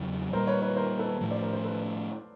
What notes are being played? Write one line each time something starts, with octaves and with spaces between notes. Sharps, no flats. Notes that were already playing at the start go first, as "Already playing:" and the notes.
Already playing: E2 C#3 F#3
A#2 G3 A#3 A#4 C5
B4 C#5
B4 C#5
A#4 C5
A4 B4
A2 F3 A3
C5 D5
A#4 C5
A#4 C5
A4 B4